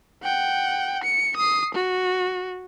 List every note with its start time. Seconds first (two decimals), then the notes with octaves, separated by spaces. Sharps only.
0.24 F#5 G5
1.04 C#7
1.37 D#6 C7
1.75 F#4